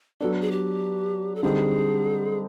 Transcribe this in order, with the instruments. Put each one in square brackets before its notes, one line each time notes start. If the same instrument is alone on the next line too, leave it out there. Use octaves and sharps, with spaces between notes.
[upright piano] F#3 B3 D4 [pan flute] A4
[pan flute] G#4
G4
A4
[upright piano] D3 G3 C4 D#4 [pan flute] G#4